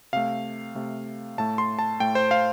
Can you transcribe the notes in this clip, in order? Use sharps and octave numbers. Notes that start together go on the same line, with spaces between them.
C3 A3 F5
C3 A3
A2 A3 A5
C6
A5
A2 A3 G5
C5
F5